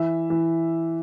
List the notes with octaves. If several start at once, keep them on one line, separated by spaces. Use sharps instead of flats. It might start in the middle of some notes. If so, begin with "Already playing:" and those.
Already playing: E3 E5
E3